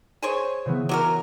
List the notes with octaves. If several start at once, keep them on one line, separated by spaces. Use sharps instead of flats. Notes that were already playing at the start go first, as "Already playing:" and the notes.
G#4 C5 C#5
C#3 E3 B3
F#3 F#4 A#4 D6